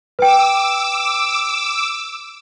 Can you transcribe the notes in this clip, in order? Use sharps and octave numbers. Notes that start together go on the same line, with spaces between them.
B4 G5 D6 E6